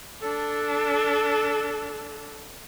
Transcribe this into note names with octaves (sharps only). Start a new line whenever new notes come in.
D4 A4